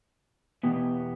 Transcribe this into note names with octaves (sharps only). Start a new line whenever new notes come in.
E2 B2 B3 G4